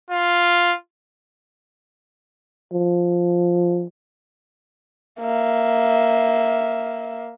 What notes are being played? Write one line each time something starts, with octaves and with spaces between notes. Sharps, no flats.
F4
F3
A#3 E5